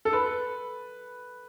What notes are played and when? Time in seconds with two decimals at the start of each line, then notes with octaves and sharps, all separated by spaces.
0.05 A4
0.13 B4